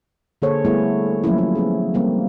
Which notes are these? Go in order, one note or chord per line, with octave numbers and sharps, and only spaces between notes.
D3 A#3 G#4 A4 C5 C#5
G3 A3 B3 E4 G#4
F3 F#3 A3 A#3 C#4 E4
E4
B3 C#4 G#4
F#3 G3 A#3 C4